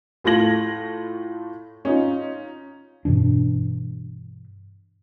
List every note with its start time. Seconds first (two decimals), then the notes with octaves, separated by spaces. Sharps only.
0.24 A2 A3 F4 G#6 A#6 F#7
1.85 C#4 D#4 F4
3.05 G2 B2 E3 D4